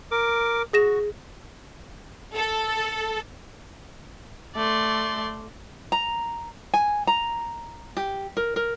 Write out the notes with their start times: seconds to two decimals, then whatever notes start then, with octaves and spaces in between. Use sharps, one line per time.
0.11 A#4 D6
0.73 F#4 G#4 A#6 E7
2.34 A4
4.56 A3 D5 C6
5.92 A#5
6.74 G#5
7.07 A#5
7.97 G4
8.37 A#4
8.56 A#4